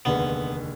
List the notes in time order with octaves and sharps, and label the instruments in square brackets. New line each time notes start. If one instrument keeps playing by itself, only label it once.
[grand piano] F1 D#2 D3 G#3 [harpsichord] B3